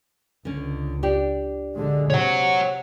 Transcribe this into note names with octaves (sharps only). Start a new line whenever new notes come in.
C#2 D3 C#4
D4 G4 D5
D3 G#3
C3 C#5 F#5